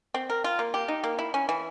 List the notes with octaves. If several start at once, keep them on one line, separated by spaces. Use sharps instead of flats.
C4
A#4
F4
A#3
G4
D#4
A#3
E4
C#4
E3